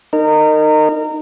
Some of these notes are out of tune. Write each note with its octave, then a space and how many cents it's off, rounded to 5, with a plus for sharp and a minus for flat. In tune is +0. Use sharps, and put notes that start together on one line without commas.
D#4 -20 A#4 -25